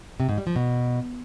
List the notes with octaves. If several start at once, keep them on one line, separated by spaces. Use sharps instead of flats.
C3
G#2
G3
F3
B2